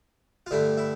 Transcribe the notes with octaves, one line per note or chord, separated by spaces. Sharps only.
F4
G2 D3 A3 E4
E4